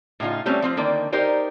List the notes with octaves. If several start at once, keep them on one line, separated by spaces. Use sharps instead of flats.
A2 C#3 D#4 F4
G3 A3 C4 C#4
F3 C4 F4
D3 D#3 A#3 D5
D#4 G4 A#4 C5 D5